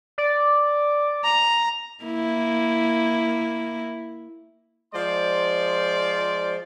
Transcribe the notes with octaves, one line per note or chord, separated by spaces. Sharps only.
D5
A#5
A#3 E4
F3 G#3 C5 D5 C6